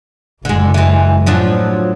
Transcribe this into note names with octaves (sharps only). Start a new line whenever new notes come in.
F#1 D3 G#3
E3 G#3
A2 F3 F#3 D4